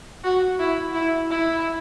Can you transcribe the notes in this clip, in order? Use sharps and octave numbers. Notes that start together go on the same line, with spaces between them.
F#4
E4
E4
E4